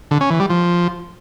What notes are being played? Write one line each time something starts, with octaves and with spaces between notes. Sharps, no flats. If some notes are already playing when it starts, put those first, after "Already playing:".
D3
C#4
E3
G3
F3